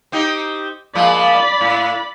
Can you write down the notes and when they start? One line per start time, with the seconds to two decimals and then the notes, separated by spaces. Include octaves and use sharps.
0.12 C4 D#4 G4
0.95 F3 G#3 A#3 D5 B5
1.61 A2